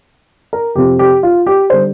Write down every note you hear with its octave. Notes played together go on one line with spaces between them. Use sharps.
A#4
F2 C3 F3 C4 G4
G4
F4
G4
D3 G3 C5